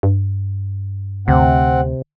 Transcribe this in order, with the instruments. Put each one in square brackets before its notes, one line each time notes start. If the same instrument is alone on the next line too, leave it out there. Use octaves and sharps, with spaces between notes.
[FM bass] G2
[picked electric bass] D2 [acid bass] C3 [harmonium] C4 F#5